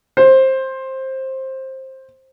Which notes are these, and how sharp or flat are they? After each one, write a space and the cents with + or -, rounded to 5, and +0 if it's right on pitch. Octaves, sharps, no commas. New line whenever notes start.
C5 +15